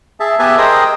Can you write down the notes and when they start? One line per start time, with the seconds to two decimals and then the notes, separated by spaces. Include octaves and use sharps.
0.20 G#4 E5 A5
0.39 B3 G4 B4 E5 G#5 A5
0.58 G#4 A#4 C5 D#5 G5 D#6